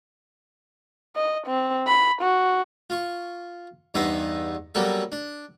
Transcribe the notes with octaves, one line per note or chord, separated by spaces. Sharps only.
D#5
C4
B5
F#4
F4 C#6
E2 G2 B3 D#4 C5 E5
F#3 G3 A#3 B3 G4 A4
D4